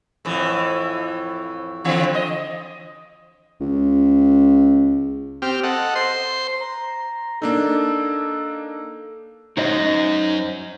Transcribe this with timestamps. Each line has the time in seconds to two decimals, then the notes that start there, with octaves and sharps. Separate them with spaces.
0.25 F2 A2 E3
1.85 D3 E3 C4
2.14 D#5
3.61 C#2
5.42 C4 G4 F6
5.63 A4 D#5 F#5
5.95 C5 C6
6.61 A#5
7.42 A#3 D4 D#4 A4
9.57 F#2 D#4 C5 D#5